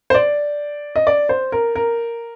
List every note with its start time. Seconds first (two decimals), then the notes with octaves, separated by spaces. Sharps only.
0.10 C5
0.14 D5
0.96 D#5
1.07 D5
1.29 C5
1.52 A#4
1.75 A#4